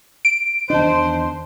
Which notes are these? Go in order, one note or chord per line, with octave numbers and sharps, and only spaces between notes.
D7
E2 D#3 D4 C5 D#5 A5